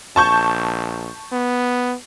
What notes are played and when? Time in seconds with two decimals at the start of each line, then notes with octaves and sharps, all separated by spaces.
0.16 A#1 A5 C#6 G6
1.32 B3